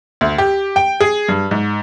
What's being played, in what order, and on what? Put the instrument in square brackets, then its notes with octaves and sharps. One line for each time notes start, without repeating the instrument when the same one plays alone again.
[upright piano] D2
G4
G5
G#4
G2
G#2